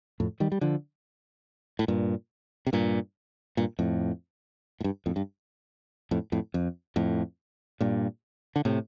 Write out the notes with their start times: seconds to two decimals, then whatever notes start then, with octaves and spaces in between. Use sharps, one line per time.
0.20 F2 A2
0.40 D#3 G3
0.52 G3
0.61 D3 F3
1.79 A2
1.88 G2 A#2
2.67 C3
2.73 G2 A#2
3.57 G2 A#2
3.79 F2 A2
4.81 A2
4.84 G2
5.06 F2 A2
5.16 G2
6.11 F2 A2
6.32 F2 A2
6.54 F2
6.96 F2 A2
7.81 G2 A#2
8.56 D3
8.65 A2 C3